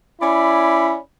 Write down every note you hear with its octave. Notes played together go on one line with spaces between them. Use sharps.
C#4 E4 D5 B5